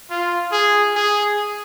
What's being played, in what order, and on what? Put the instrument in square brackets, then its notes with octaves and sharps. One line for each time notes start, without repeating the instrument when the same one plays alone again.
[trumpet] F4
G#4
G#4